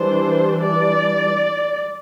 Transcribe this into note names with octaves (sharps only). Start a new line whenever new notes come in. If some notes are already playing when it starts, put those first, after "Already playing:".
Already playing: E3 G3 D4 C5
D5